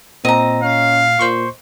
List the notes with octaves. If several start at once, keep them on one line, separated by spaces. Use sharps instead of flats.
A#2 C4 D#5 A#5
C#4 F5
A#2 C5 C6 C#6